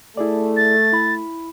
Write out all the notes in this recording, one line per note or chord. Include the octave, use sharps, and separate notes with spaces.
A3 E4 G#4 D5
A6
E4 B5